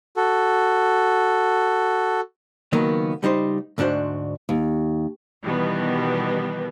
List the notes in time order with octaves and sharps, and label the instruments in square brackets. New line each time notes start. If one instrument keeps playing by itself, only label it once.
[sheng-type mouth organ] F#4 A4
[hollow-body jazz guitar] C#2 D#3 F#3 A#3 B3
C#2 G3 D#4 C5
D2 G#2 D4 F#4 C5
[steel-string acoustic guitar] D#2
[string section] B2 D#3 E3 G3 B3